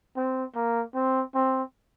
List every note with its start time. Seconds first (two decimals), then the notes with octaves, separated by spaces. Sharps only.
0.16 C4
0.55 A#3
0.95 C4
1.35 C4